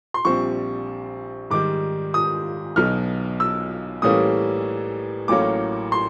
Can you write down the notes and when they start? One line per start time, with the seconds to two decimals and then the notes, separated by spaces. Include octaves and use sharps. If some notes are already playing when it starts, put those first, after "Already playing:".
0.14 C6
0.25 A#1 A#2 G3 C4 C#6
1.50 G#2 D#3 G3 D6
2.14 D#6
2.76 B1 B2 F#3 F6
3.40 E6
4.02 A2 E3 G3 A#3 C#4 D#6
5.28 A1 A2 F#3 A#3 C#4 D6
5.92 C6